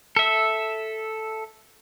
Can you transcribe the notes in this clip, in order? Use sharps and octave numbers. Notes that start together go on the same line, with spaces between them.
A4 E5